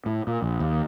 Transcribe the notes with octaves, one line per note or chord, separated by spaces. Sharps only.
A2
A#2
A#1
D#2